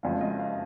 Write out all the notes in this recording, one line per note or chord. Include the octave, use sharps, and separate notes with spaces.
F#1 F2 C#3 G#3 F5
D#5
F5